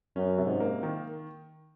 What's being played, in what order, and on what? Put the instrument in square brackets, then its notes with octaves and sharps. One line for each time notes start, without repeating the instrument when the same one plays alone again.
[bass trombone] F#2 [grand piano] C#4
[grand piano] C3
[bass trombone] G#2
[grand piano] A#3
D#3